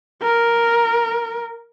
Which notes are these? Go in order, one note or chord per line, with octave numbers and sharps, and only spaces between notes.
A#4